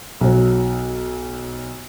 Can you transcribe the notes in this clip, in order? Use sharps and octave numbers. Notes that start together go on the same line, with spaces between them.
B1 F#3